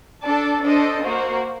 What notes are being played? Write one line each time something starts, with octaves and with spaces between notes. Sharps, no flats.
D4 A4 D5 A5
D4 A4 C5 D#5
A#3 F#4 C5